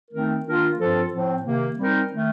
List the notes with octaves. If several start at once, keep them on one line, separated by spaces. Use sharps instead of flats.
D#3 A3 C4 D#4 A#4
D#3 A#3 D4 F4 A#4
G2 F3 C4 F4 A4
A2 F3 C4
C3 D#3 A#3
G3 C4 D#4 A#4
D#3 A3